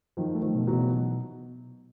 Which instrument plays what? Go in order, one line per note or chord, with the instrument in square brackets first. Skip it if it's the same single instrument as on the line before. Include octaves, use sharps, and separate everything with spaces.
[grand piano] D#3 F3 [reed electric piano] F#3
[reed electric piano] A3
[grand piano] D#3 F3
[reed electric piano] B2
[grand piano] E3 F#3
[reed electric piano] B2